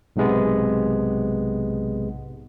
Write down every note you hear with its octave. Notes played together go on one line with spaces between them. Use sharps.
B1 G#2 C3 G#3 B3